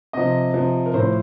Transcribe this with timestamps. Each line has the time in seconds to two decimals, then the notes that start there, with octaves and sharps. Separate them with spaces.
0.13 C3 F3 D#5
0.54 C3 F3
0.86 A#4
0.94 A2 F3 C5